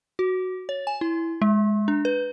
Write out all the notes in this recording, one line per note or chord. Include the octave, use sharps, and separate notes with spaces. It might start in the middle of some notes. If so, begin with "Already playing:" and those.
F#4
C#5
G#5
E4
G#3
D4
B4